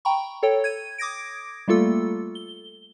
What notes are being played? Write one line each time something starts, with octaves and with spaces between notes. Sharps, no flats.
G5 A#5 B5 C#6
A4 C#5 G5
G#6 D#7
D6 D#6 G#6 A#6 D7
G3 A3 A#3 F4 A4 E6
G7